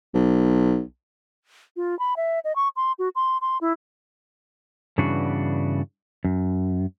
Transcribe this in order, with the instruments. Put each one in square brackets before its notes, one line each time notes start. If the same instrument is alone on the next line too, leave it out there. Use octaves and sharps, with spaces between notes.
[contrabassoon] B1
[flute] F4
B5
E5
D#5
C#6
C6
F#4
C6
C6
E4
[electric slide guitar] G2 C#3 E3 B3 D4 F#4
F#2